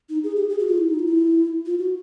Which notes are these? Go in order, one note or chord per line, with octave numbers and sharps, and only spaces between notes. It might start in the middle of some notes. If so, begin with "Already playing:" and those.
D#4
G#4
G4
G#4
F#4
F4
E4
D#4
F4
E4
F4
F#4